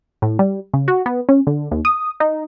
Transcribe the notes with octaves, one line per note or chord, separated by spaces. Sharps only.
A2
G3
C#3
F#4
B3
C#4
D3
D#2
D#6
D#4